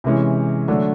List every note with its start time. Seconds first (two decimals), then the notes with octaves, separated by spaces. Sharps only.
0.04 C3 E3 G#3 C#4
0.68 D3 F#3 A3 D4